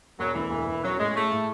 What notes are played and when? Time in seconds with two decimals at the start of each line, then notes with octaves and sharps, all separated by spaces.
0.19 E1 F#3
0.35 D2 E3
0.51 E1
0.68 E1
0.84 F#3 C#4
0.99 A2 G#3
1.15 A3 G#4
1.31 A2